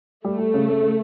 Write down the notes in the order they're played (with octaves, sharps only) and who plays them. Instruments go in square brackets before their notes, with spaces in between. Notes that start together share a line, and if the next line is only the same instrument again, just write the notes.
[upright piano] G3 [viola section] A3
[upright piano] G3
C#3
C#3
C#3